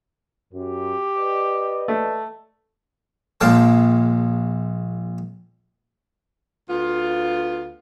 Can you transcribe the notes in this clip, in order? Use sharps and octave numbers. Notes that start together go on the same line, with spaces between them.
F#2 G4
B4 D5 D#5
A3
A#1 G#3 F5 G5 A5
D2 B3 F4